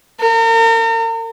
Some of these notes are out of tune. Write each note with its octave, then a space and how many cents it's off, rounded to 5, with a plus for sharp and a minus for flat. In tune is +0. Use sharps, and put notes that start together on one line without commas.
A#4 -40